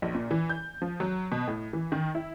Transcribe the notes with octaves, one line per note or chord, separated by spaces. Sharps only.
A#1
A#2
E3
G6
F3
F#3
B2
A2
E3
D#3
E4